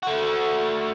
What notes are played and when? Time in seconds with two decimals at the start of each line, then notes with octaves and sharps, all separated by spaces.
0.03 A3 F#4